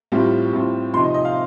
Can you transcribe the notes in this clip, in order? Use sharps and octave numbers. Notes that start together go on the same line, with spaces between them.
A2 G3 C4 F4
A2 G3 C4 F4
C3 F3 C4 D#4 C6
D#5
D#5
F5